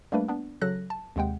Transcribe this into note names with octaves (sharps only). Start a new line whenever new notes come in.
G3 A3 A#3 D4 B4
B3 D4
C#3 F#3 A4 F#6 A#6
A5
D#2 C3 G#3 F#5 G5